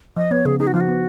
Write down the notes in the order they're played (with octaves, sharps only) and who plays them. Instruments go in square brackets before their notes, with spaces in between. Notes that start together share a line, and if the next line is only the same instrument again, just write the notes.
[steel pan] F3 [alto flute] D#5
[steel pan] B3 [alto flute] C#5
[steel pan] C#3 [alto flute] G#4
[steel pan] D#4 [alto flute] G#4
[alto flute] F#4
[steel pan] F3 [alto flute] F4
[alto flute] F#4
[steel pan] B3